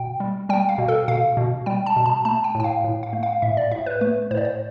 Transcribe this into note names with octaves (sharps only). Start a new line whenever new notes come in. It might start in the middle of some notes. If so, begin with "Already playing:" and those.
Already playing: B2 G5
G3
G3 G5
F5
B2
A4
B2 F5
B2
G3 G5
A5
B2
A5
A3 A5
G5
A2
G5
F5
A2
F5
A3
F5
A2 E5
D5
A2 E5
B4
A3 B4
A2 C5
D5
C5